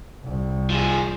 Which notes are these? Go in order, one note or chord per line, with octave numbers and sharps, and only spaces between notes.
C2
F3 G#4